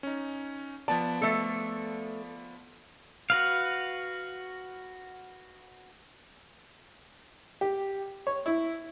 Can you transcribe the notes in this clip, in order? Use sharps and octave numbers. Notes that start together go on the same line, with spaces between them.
C#4 D#4
F3 B3 D5 A5
A3 A4
F#4 B4 F5
G4
C#5
E4